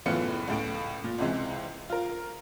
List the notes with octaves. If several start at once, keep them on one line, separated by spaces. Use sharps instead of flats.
F#1 A2 E3 B3 F4 C#7
C#2 A2 D7
A#2
C#2 C3 E3 G#3
F4 A#4